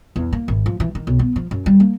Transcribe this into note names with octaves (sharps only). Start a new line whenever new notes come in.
E2
A#3
G#1
F3
E3
D#3
B1
B3
F3
F#2
G3
A#3